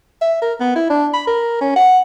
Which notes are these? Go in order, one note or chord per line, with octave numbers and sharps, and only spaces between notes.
E5
A#4
B3
E4
D4
B5
A#4
C#4
F#5